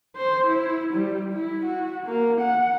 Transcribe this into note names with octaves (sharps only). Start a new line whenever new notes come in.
C5
E4
G3
E4
F#4
A#3
F#5